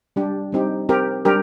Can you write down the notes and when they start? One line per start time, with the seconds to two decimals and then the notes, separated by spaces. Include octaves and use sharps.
0.16 G3 D4 G4
0.52 G3 C4 D#4 G4
0.89 C4 G4 A#4
1.25 G3 D4 G4 A#4